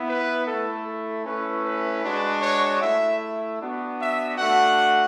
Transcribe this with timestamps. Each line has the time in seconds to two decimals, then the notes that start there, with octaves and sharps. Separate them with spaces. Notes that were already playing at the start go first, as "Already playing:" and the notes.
Already playing: B3 E4
0.09 B4
0.47 A3 E4 A4
0.87 A4
1.25 A3 C#4 E4 B4
1.65 B4
2.04 G#3 D4 F#4
2.42 C#5
2.82 A3 E4 E5
3.60 B3 D4 F#4
3.99 E5
4.37 A3 D4 F#4 F#5